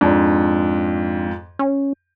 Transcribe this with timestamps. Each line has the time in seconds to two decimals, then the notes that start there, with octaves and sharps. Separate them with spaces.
0.01 F2 G#2 D4
1.59 C#4